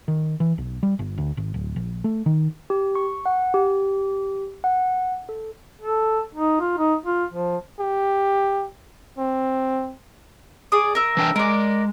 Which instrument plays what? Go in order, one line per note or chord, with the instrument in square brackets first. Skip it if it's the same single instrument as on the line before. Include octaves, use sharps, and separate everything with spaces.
[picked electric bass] D#3
E3
B1
G3
G1
D2
G#1
D1
A#1
A3
D#3
[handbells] G4
C#6
F#5
G4
F#5
A4
[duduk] A4
D#4
F4
D#4
F4
F3
[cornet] G4
C4
[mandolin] G#4 D5 D#6
A#4 E5
[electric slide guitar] E3 D4 G5
[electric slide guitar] G#3 [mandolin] A#4 D5